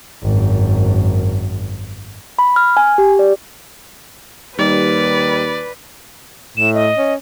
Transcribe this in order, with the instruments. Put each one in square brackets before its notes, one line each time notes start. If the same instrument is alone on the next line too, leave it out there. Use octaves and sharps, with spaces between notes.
[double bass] G#1 F#2
[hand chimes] B5
F6
G#5
G4
D5
[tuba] D#2 [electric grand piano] G3 D#4 [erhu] B4 [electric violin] D5
[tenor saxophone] A2 [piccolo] E7
[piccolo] D#5
[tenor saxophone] C#4